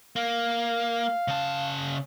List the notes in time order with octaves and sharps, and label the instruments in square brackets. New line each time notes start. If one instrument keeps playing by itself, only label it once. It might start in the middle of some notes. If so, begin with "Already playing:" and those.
[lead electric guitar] A#3 [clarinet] F5
[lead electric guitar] C#3 A5